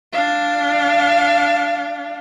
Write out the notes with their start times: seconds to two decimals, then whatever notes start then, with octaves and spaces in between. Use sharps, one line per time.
0.13 D4 F5